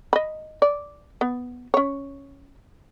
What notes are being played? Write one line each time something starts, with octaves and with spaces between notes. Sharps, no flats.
D#5 B5
D5
B3
C#4 C#5